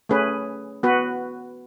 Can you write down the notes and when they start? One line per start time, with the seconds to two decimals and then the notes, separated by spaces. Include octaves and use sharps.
0.09 A3 C#4 G#4 B4
0.83 B3 F#4 B4